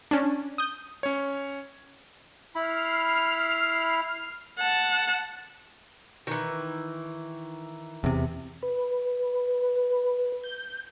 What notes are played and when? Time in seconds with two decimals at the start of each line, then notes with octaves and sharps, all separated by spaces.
0.11 C#4 D4
0.58 D#6 G6
1.03 C#4 C#5
2.55 E4 B5 F6 C7
4.59 F#5 A5
6.27 D#3 E3
8.04 E2 C3
8.63 B4
10.44 G6